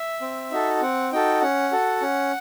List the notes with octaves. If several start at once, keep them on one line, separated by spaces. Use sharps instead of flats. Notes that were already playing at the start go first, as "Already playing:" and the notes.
Already playing: E5
C4
D#4 F#4 A4
C4 F#5
D#4 F#4 A4 G5
C#4 F#5
F#4 A4
C#4